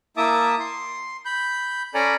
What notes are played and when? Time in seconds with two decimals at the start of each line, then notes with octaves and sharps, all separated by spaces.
0.17 A#3 E4 E5 A5 D6 D#6
0.60 C6
1.25 B5 G6
1.94 C#4 A4 D5 G#5 A#5 B5